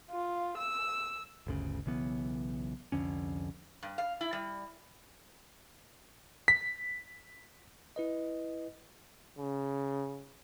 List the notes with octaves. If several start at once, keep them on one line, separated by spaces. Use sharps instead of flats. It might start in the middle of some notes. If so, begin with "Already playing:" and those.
F4
E6
G1 D2 C#3
B1 C#3 E3 B3
C2 F2 D3 C#4
G2
F5
E4
G3
B6
E4 B4 D#5
C#3